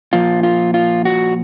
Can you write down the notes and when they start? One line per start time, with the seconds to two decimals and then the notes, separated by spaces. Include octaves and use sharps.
0.13 A#2 F3 F4
0.43 F4
0.74 F4
1.05 F#4